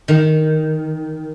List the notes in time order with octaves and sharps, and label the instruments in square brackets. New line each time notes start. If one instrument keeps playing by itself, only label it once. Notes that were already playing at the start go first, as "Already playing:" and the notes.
[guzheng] D#3